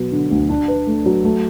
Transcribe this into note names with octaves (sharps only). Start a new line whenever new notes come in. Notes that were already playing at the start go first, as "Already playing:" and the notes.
Already playing: B2 F#3 B3
D3
D2
D4
B4
A3
F#3
A3